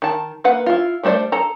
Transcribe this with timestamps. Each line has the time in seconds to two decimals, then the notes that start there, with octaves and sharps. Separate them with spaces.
0.02 D#3 A5
0.44 A#3 B4 F#5
0.66 E4 F4
1.03 G3 A3 D4 C5 D5
1.32 A4 A#5